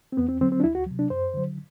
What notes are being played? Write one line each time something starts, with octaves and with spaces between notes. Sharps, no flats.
C4
E2 B3
C4
D3 F#3 C4
C4
D4
D2 E4
F#4
C3 F#3
D4
F#2 C5
D3 F#3